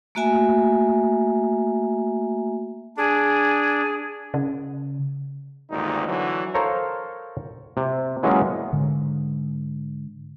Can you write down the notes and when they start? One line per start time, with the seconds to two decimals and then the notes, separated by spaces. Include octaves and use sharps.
0.15 A3 A#3 F#4 E5 G#5 A#5
2.97 D4 G#4
4.34 C#3
5.70 G#1 D2 G2 A#2 D#4
6.07 D3 E3 F#3
6.54 A4 A#4 C5 C#5 F5 A#5
7.77 C3
8.23 E3 F#3 G#3 A#3 B3 C#4
8.73 G#2 D3